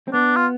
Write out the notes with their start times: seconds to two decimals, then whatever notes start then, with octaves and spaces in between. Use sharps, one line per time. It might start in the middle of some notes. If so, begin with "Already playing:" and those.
0.08 C4
0.13 B3 D4
0.36 F4